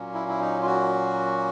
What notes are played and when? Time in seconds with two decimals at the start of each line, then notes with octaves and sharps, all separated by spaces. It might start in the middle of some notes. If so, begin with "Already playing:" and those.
Already playing: A#2 F#3 A#3 C#4
0.14 E4
0.28 E4
0.40 D#4
0.62 F4
0.66 F#4